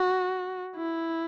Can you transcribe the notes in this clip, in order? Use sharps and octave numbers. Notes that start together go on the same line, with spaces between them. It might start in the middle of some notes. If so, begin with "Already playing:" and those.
Already playing: F#4
E4